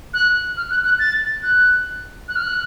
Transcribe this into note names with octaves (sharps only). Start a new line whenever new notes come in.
F#6
F6
F#6
F#6
A6
F#6
F#6
F6
F#6